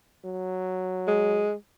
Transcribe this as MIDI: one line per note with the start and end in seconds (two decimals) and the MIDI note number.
0.25 1.45 54
1.08 1.54 56